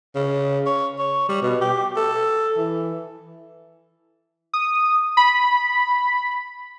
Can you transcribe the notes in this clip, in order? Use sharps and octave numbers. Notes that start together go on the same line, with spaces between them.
C#3
C#5
C#5
G3
B2
G4
A4
E3
D#6
B5